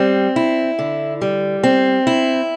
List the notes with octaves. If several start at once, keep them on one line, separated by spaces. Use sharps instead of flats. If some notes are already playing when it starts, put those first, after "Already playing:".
Already playing: G3 C4
E4
D3
G3
C4
E4